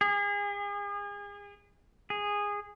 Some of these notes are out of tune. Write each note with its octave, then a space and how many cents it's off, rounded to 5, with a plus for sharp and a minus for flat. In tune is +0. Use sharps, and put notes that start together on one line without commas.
G#4 -35
G#4 -15